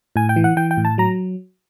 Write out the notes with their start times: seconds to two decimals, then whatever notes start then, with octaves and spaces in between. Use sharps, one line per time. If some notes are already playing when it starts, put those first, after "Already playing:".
0.16 A2 G#5
0.29 G5
0.36 E3
0.44 F#5
0.57 E3 G5
0.71 G5
0.77 A2
0.85 A5
0.98 F#3 A#5